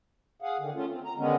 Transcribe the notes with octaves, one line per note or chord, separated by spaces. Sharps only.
G#4 F5 F#5
D3 D#3
A3 C#4 F4
C4
A#5
D3 D#3 G#3 B3 C#4